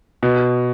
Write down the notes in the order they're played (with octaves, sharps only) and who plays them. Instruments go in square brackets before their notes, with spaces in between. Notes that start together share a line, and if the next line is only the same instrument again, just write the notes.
[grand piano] B2